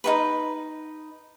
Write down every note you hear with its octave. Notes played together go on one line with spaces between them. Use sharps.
D#4 F#4 B4